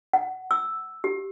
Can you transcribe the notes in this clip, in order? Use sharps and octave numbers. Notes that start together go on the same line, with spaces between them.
F#5
E6
G4